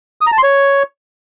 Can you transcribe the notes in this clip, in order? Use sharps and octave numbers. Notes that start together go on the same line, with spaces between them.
D#6
A#5
A5
C6
C#5